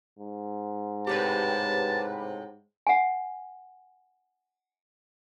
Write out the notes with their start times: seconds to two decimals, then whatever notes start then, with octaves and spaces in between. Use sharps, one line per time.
0.19 G#2
1.07 A2 C3 G4 B4 A5
2.87 F#5 G#5